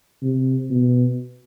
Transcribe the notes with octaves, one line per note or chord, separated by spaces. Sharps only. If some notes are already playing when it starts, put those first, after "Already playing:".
C3
B2